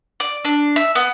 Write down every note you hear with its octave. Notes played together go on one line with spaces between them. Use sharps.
D5
D4
E5
B3